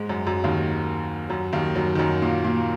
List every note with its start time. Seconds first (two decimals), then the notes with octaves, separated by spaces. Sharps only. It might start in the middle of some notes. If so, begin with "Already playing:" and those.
Already playing: G#2 G#3
0.09 F#2 F#3
0.27 F#2 F#3
0.44 D#2 D#3
1.29 F#2 F#3
1.53 D#2 D#3
1.75 F#2 F#3
1.95 D#3
1.99 F#2 F#3
2.22 A#2 A#3
2.44 A#2 A#3